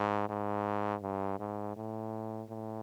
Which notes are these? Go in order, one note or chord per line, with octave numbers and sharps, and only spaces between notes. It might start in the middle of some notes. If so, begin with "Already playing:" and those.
Already playing: G#2
G#2
G2
G#2
A2
A2